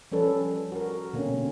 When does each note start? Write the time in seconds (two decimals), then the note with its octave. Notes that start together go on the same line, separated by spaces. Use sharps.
0.12 F3 G3 C#4 A4 B4
0.72 F#4 A#4
1.13 B2 D3 A#3 C4 C#4